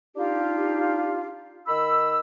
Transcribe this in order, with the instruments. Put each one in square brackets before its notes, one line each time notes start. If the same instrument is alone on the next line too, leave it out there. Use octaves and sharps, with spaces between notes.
[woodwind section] D4 D#4 F4 G4
D#3 B5 E6